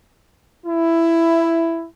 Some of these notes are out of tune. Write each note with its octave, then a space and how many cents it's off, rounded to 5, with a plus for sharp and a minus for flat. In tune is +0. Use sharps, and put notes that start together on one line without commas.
E4 +10